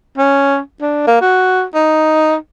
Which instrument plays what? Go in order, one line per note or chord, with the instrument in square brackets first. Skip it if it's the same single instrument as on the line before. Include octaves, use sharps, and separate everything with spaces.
[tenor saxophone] C#4
D4
A#3
F#4
D#4